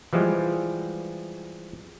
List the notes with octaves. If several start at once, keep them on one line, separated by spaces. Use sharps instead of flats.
E3 F3 G3 G#3